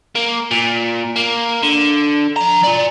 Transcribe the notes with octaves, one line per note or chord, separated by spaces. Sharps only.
A#3
A#2
A#3
D3
F3 A#5
F4 D5